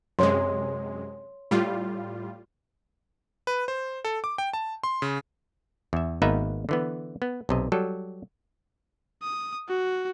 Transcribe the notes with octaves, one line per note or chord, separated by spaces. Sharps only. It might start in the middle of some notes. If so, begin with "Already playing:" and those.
F#2 C3 G#3 C#5 C6
A2 G3 F4
B4
C5
A4
D6
G5
A5
C6
C#3
E2 E5
G#1 A#3 B3 D#4 B4 E5
D3 E3 B3
B3
B1 C3 D#5
F#3 G3 A4
D#6
F#4